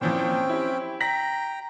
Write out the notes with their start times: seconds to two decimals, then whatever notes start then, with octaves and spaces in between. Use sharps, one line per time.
0.01 A#2 E3 F3 C4 C#4 G5
0.49 E4 G4
1.00 G5 A#5 A#6 B6 F#7